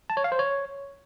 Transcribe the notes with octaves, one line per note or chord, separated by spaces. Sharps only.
A5
C#5
F5
C5
C#5